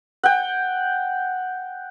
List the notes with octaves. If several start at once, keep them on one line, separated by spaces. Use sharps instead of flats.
F#5 G5